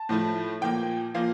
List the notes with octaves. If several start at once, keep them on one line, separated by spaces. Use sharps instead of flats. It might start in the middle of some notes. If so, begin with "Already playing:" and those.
Already playing: A5
A2 F3 A3
A#2 F3 A#3 G5
A#2 F3 A#3 F5